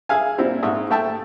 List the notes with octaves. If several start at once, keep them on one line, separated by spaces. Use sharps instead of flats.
G#4 E5 F5 G#5
A#2 G3 C4 E4
G#2 E5 C#6 D#6
A3 E5 G5 A5